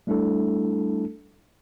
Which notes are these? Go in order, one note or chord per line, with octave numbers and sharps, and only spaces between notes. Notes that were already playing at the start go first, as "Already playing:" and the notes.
G3 A3 D4 E4 A4